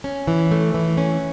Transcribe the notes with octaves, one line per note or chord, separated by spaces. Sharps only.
C#4
E3
A3
E3
C#4